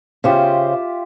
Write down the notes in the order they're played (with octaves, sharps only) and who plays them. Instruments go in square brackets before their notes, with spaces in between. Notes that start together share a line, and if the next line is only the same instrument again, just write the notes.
[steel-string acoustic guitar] C#3 C5 [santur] F4 G4 E5